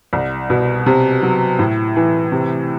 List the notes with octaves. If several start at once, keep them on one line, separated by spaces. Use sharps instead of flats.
C2
B2
C3
F#3
A2
E3
C3